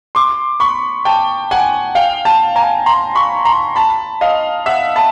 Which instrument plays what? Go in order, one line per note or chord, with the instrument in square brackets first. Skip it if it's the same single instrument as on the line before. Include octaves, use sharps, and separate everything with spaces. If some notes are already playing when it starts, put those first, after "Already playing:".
[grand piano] C6 D6
B5 C#6
G5 A5
F#5 G#5
F5 G5
G5 A5
G#5 A#5
A#5 C6
B5 C#6
A#5 C6
A5 B5
D#5 F5
E5 F#5
A5 B5